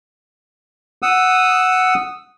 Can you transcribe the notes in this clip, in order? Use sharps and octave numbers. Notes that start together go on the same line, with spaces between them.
F#5 D#6 E6